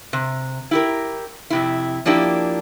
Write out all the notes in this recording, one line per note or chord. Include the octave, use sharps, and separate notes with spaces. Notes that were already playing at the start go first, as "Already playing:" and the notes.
C3
E4 G4 A#4
F2 C3 E4
F3 A#3 D4 E4 G4